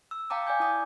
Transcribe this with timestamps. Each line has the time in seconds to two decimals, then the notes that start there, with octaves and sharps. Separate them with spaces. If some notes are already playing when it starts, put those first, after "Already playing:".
0.11 E6
0.30 F5 G5 A5 A#5 D6
0.47 D5 G#5 G6
0.60 E4 D6 D#6